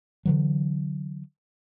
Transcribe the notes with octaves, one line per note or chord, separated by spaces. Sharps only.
D3 E3 F#3